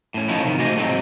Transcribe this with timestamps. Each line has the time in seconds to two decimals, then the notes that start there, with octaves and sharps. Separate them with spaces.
0.14 A2 C#4
0.28 F3 B3 C#4 D#4 E4
0.44 C3 D#3
0.59 A3 F#4 G4 C5 D#5 G#5
0.77 G#2 C3 F#3 C4 D#4